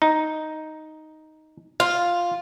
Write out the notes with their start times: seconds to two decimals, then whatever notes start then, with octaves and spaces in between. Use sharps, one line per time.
0.02 D#4
1.80 F4 F5